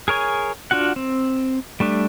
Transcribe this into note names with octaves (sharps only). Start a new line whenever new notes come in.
G#4 A#4 C#5 G#5
D4 F4 F#4 F#5
C4
G3 A3 D4